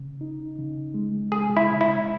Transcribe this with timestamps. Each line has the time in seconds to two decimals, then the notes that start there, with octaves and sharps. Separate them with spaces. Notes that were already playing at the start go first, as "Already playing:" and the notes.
Already playing: C#3
0.21 D#4
0.59 C#3
0.94 G#3
1.31 G#3 G#4
1.57 E4
1.69 C#3
1.81 E4